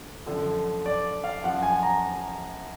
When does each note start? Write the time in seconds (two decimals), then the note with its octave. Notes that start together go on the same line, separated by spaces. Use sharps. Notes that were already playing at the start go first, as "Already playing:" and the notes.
Already playing: D2
0.26 F#2 D3 F3
0.86 D5
1.24 F5
1.44 F#2 F3 F#5
1.63 G#5
1.83 A#5